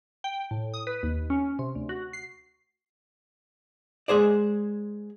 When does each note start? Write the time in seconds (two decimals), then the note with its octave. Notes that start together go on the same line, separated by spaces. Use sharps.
0.24 G5
0.51 A2
0.74 D#6
0.87 B4
1.03 D#2
1.30 C#4
1.59 C3
1.75 D2
1.89 F#4
2.13 C7
4.08 G#3 G#4 C5 D5